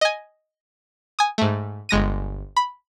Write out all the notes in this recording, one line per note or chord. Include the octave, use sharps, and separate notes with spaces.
D#5 G#5
G#5 D#6
G#2 A3
G1 G#3 A#6 D#7
B5